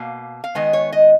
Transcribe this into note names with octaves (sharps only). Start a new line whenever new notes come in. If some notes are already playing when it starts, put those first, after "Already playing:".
Already playing: B2 A#3 F5
F5
D#3 G#3 B3 D#5
C#5
D#5